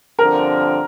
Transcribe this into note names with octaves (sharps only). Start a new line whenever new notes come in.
G2 D3 F3 C4 A#4